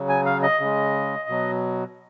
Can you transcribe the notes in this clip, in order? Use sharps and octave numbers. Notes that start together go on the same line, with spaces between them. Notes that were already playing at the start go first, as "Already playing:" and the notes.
Already playing: C#3 F#3
G#5
F5
D#5
C#3 G#3
B2 F#3